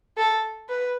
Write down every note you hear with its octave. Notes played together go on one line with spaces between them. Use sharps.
A4
B4